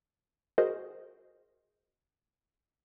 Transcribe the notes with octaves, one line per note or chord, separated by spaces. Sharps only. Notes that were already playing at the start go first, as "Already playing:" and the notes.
F#4 G#4 A#4 C5 D#5